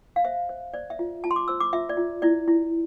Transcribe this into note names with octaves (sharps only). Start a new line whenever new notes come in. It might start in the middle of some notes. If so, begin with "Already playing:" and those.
F5
C5 E5
C5
C5 D5
E5
F4
F4 A5
C6
D6
C5 E6
D6
F4 E5
D5
F4
E4 D5
E4